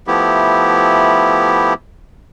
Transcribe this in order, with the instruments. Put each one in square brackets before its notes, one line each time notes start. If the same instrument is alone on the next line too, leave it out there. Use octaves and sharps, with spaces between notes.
[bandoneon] F3 A3 B3 E4 G4